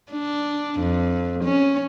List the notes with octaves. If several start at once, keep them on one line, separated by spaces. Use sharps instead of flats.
D4
F2
C#4